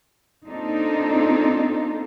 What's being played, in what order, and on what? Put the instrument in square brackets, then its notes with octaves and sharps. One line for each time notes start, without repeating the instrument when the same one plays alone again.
[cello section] A#3 C4 D4 D#4 F4 A4